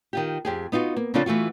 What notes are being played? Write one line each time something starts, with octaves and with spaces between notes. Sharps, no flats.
D#3 F4 G4
F2 G4 G#4
B3 D#4 F4 F#4
A#3
C#3 F3 C4 D4 F4 A4
E3 A3 F4 F#4